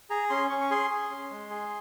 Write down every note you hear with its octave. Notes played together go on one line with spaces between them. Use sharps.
G#4 A#5
C#4 C6
C#4 C#6
C#6
G#4 C6
G#4
C#4
G#3
G#4